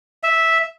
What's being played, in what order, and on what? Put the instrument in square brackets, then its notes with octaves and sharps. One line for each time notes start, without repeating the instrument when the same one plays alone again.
[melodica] E5